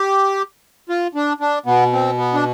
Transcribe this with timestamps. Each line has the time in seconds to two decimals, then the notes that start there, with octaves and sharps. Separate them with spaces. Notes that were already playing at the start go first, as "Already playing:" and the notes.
Already playing: G4
0.89 F4
1.15 D4
1.41 D4
1.66 B2 B3
1.93 C4
2.18 B3
2.34 D4